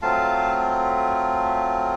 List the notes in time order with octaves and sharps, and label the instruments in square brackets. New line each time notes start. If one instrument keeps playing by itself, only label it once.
[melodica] F#3 A3 C4 F4 F5 A5